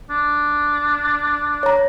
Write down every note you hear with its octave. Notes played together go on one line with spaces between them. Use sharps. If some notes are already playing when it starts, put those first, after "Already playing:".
D4
C#5 A#5